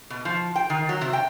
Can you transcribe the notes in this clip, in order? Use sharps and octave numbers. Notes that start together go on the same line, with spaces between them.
B2
F3
G5
D#3
F#3
C3
G5